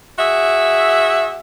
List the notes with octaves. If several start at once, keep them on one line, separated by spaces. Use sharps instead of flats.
F#4 G#4 E5